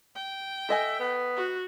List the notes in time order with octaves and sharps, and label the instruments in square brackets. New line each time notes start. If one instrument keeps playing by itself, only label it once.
[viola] G5
[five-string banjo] A4 D#5 G#5 [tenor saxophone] E5
[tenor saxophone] B3
[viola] F#4